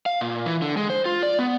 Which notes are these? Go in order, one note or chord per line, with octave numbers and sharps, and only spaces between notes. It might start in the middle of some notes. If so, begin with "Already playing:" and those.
F5
A#2
E3
D3
G#3
C5
F4
D5
B3